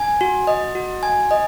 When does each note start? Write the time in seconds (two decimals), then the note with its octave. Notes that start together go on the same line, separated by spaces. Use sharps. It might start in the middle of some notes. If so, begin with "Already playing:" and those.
Already playing: G#5
0.21 F#4
0.47 D#5
0.75 F#4
1.03 G#5
1.31 D#5